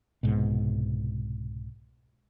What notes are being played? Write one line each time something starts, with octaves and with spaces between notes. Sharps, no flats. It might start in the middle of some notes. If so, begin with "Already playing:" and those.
C2 G#2 B2